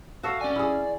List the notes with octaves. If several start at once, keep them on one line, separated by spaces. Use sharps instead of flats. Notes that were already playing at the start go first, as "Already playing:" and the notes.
F#4 A4 E5 F5
C#4 D5 G#5
E4 G#4